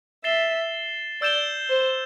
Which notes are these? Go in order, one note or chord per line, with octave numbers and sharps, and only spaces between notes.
E5 A6 C7 E7 G7
D5 E6 G6 E7 G7
C5